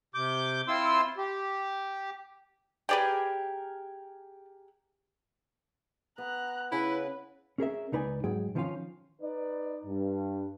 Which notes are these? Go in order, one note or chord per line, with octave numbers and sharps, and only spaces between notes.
C3 D6 G6
C4 E4 F4 C6 E6
G4
G4 G#4 A#4 B4 D5 G5
B3 A#5 F#6
C#3 E4 B4
C#4 G#4 A#4 E5
C#2 D#4 B4 D5 G#5
G#2 F#3 G#4 G5
D#3 F3 B3 C#4 F4 F5
D#4 B4 D5
G2